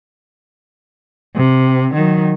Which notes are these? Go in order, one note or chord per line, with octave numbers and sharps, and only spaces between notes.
C3
D#3 F#3